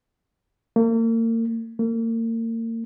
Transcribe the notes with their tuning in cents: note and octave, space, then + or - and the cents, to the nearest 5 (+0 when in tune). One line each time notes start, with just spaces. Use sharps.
A#3 -40
A#3 -40